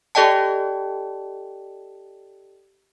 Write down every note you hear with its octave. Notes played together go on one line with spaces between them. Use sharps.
G4 A4 D5 D#5 G5 A5